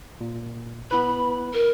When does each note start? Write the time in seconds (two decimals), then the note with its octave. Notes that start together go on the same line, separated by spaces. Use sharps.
0.21 A#2
0.91 B3 E4 B4 B5
1.53 A#4